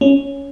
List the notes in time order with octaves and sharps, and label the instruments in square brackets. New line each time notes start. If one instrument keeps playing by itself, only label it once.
[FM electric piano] C#4